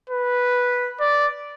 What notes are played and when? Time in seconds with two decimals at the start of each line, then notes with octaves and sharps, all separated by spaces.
0.10 B4
1.00 D5